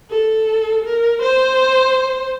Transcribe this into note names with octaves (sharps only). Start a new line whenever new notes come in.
A4
A#4
C5